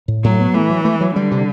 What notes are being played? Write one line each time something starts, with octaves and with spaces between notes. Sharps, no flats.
A2
A2 F#3
B3
E3 A3
F#3
A3
F#3
D3 G3
C3